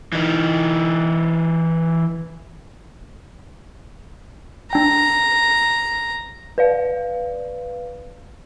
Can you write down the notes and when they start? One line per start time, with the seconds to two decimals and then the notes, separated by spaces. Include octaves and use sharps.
0.13 E3 D#4
4.73 D4 G5 A#5
6.58 B4 D5 F5